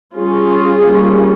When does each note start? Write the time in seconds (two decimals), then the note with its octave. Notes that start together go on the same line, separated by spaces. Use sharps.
0.17 G3 C#4 F4 G#4
0.84 G3 A#3 C#4